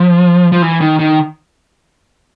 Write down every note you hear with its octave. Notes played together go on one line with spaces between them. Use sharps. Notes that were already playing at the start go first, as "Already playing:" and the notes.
Already playing: F3
F3
E3
D#3
D#3